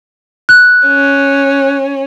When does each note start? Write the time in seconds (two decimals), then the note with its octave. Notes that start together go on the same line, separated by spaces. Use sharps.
0.49 F#6
0.87 C#4